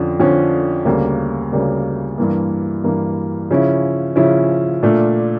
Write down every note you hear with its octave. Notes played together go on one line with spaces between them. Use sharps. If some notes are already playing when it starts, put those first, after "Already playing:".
Already playing: F2 D3 F3 C#4
F2 D3 F3 C#4
D2 C#3 G3 A#3
D2 C#3 G3 A#3
G2 E3 A#3
G2 E3 A#3
C#3 F3 C#4 E4
C#3 F3 C#4 E4
A#2 A3 D4 F4